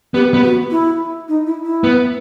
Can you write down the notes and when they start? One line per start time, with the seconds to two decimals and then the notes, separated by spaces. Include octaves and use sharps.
0.14 B3 G4
0.34 B3
0.43 F#4
0.71 E4
1.28 D#4
1.46 E4
1.65 E4
1.84 B3